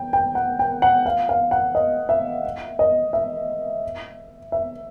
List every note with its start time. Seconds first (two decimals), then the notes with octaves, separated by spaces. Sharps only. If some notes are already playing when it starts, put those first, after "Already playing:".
Already playing: G5
0.13 G5
0.35 F#5
0.59 G5
0.82 F#5
1.06 F5
1.29 F5
1.51 F#5
1.75 D#5
2.09 E5
2.79 D#5
3.13 E5
4.52 E5